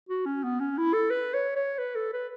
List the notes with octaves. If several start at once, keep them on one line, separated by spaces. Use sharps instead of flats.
F#4
C#4
B3
C#4
E4
A4
B4
C#5
C#5
B4
A4
B4